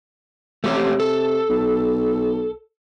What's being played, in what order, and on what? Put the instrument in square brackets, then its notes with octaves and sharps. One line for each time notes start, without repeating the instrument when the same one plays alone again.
[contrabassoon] C3 [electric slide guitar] A3 G4 C#5
[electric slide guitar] A4
[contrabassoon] B1